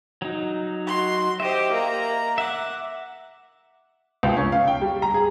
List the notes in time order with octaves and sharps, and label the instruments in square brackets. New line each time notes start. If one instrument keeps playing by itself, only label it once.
[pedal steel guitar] F#3 D#4
[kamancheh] F#4 C6
[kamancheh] G4 C5 [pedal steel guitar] D#5 E5
[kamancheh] A#3 A#5
[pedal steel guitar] E5 D6 [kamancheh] F#5
[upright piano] C#2
C#4
F5
G5
G3
A#5
G#4